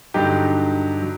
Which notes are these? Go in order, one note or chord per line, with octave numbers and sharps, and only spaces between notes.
G2 D3 F#3 D#4 G4
F#3